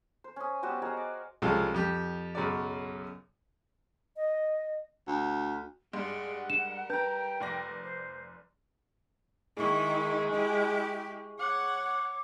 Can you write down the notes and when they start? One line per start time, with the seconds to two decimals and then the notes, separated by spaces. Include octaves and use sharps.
0.24 C5
0.36 C#4 D#6
0.63 G3 B3 F#4 C5
0.82 F#4 G#4 A#4 D#5
0.97 D5
1.42 C2 C#3 F3 G#3 A4 F5
1.74 F2 G4
2.35 B1 F#2 C#3 F#3 D5
4.16 D#5
5.07 D2
5.93 G2 G#3 G#4 D5 F#5 C6
6.50 G3 A#4 E7
6.90 B4 G5 A5 A#5 G6
7.40 F1 D5 A#6
7.82 C5
9.57 D#3 G#3 E4 G#4 C#6
10.33 E4 G4
11.40 C#5 F#5 D6